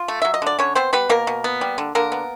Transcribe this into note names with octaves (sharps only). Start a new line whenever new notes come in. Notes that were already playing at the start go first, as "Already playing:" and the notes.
Already playing: F4
A3
F#3 E5
D#5
D3 D5
D3 C#4 C#5
B3 C4 C5
G3 B3 B4
B2 A#3 A#4
B2
B3
G3
D3
D3 A#3 A#4
B3